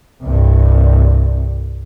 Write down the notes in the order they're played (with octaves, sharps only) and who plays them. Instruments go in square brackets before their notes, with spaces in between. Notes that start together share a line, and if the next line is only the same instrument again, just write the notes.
[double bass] C2 G2